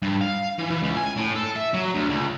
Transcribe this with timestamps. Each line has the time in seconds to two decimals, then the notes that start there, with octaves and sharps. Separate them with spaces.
0.02 G2
0.21 F5
0.58 E3
0.70 E3
0.83 C#2
0.97 G#5
1.17 A2
1.36 A4
1.56 E5
1.74 F#3
1.95 D2
2.09 C#2